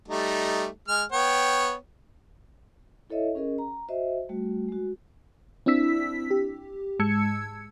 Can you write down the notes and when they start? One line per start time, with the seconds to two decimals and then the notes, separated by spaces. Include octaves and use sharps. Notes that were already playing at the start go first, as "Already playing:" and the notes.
0.08 G3 A3 D#4
0.88 G#3 F6
1.12 B3 C#5 G5
3.10 E4 A4 C#5 D#5 E5
3.35 C#4 G#4 A#4 D#5
3.58 A#5
3.89 F#4 C5 D#5 E5
4.29 G3 A3 F#4
4.68 G#3 F#4
5.66 C4 D4 E4 E6 B6
6.31 G4
6.99 G#2 G#3 A5 E6 G#6 C#7